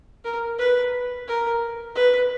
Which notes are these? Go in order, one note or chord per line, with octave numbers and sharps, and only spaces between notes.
A#4
B4
A#4
B4